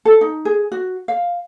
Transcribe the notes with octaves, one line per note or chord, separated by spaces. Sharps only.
A4
D#4
G#4
F#4
F5